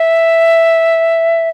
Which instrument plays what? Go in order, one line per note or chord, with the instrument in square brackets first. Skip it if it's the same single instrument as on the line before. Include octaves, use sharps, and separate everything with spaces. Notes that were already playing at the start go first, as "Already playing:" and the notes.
Already playing: [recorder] E5